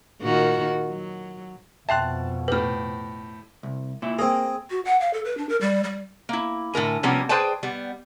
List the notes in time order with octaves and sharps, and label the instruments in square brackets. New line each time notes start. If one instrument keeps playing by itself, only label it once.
[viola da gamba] A#2 D#3 F#4
F#3
[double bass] F2 B2 [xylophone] E5 G5 C6 [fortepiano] A5 F#6
[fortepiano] A2 G4 [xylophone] B4 F6
[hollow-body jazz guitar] C2
A#2 E4
[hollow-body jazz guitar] A#3 [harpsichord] C4 G#4
[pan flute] F#4
F#5
F5
A4
B4
D4
A#4
G3
G3
[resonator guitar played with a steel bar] A#3 E4
A2 D3 A#4 G#5
C3 F3 G3 A#3 B3 C#4
G#4 B4 C5 D5 G5 A5
G3 B3